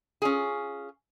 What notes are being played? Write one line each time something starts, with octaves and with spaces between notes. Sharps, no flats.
C#4 F4 G#4